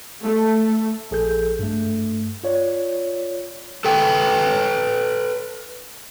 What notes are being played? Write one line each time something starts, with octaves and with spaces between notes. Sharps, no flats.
A3
A#1 G#4 A4 G6
G2 A3
F4 C#5 D5
A4 B4 G5